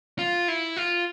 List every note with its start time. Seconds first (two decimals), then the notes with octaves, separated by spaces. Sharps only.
0.19 F4
0.48 E4
0.77 F4